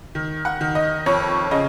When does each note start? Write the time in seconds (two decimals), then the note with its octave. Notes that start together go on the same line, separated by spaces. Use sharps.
0.15 D#3
0.45 F#5
0.61 D#3
0.75 D#5
1.06 F2 C#5
1.51 C#3 D#5